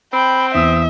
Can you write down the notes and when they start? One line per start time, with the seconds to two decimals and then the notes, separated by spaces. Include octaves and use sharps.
0.13 C4 G5 B5
0.55 E2 E5 D#6